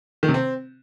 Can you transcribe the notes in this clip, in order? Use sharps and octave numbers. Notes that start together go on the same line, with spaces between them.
D#3
C3
C4